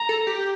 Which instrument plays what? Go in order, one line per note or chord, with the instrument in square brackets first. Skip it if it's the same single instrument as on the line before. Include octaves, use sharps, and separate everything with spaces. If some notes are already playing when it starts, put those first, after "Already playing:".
Already playing: [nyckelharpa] A#5
[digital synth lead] A4
G4